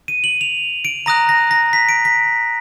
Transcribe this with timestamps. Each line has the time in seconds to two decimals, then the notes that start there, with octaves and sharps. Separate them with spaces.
0.08 D#7
0.24 F#7
0.41 F7
0.85 D7
1.06 A#5 D#6 F#6 A#6
1.29 A#6
1.51 A#6
1.73 B6
1.89 D7
2.05 B6